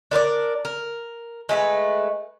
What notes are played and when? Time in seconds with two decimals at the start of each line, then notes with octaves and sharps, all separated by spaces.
0.11 D4 A#4 B4 D5
0.65 A#4
1.49 G#3 A3 G#4 B4